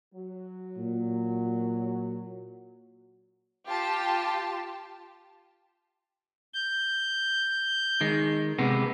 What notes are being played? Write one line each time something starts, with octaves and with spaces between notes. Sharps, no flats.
F#3
A#2
F4 G4 A5
G6
D#3 G#3
C3 G#3 B3